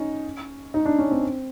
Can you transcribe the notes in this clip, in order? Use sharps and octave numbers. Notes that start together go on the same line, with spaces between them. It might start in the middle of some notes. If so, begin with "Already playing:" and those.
Already playing: C#4 D#4
D#4
D4
C#4
C4